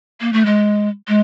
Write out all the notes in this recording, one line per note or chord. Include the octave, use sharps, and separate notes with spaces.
A#3
A3
G#3
G#3